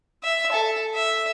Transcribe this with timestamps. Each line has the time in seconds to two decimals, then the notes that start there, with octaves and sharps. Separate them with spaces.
0.23 E5
0.52 A4
0.95 E5